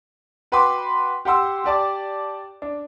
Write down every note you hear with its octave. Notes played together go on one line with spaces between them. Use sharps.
F#4 B4 G5 B5 C6 D6
G4 F#5 C6 E6
G4 D5 A5 D6
D4